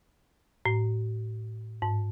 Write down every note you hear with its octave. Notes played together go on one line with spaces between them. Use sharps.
A2
G#2